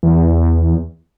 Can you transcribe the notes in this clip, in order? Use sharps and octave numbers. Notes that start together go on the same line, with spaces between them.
E2